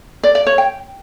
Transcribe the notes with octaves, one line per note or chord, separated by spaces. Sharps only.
D5
D5
C#5
G5